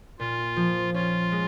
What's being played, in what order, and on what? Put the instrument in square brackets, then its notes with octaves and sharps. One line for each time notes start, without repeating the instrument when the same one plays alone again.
[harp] A#2 [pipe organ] F4
[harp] F3
[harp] C#4 [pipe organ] F4
[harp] G#3